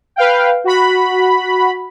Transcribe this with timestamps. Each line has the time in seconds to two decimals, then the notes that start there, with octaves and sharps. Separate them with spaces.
0.16 B4 F5 G5
0.64 F#4 B5